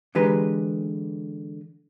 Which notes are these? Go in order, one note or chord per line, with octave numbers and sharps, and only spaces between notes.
D3 E3 G#3 G4 B4 A#5